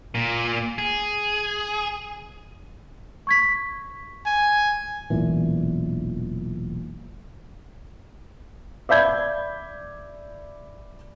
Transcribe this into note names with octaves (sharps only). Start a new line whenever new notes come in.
A#2
G#4
C#6 G#6 B6
G#5
E1 B1 A#2 E3
D5 E5 B5 G6 G#6